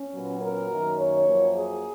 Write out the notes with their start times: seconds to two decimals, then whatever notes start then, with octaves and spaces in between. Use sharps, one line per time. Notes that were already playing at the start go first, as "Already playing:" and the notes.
Already playing: C#4
0.12 A#2 F#3 B3
0.39 A#4
0.69 F#2 D#3 A#3
0.97 C#5
1.25 F#2 F3 A#3
1.54 G#4